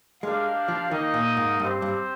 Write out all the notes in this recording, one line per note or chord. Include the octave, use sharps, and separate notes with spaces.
G#3 D4 G4 A#4 F5
F3
D#3 A#3 D#4 A#4 D#5
A#2
G#2
G2 C4 G4 C5
G2